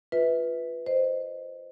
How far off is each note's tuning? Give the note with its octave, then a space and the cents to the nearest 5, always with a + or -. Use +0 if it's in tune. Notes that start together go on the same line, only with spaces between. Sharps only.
F4 +0 B4 +0 E5 -30
C5 +0 D#5 -15